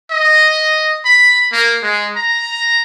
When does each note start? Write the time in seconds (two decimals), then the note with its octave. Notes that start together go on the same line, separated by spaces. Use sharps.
0.11 D#5
1.05 B5
1.53 A#3
1.83 G#3
2.16 A#5